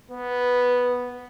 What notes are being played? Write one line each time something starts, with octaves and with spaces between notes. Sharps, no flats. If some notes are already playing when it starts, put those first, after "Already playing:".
B3 B4